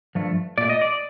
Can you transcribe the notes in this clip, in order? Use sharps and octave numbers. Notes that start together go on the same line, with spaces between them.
G2 F3 A3
A#2 A3 D5
D#5
D5